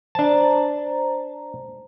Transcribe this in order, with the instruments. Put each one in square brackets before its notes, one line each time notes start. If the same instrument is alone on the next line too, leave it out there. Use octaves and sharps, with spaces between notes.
[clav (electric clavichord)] D4 A5 [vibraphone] C5 A#5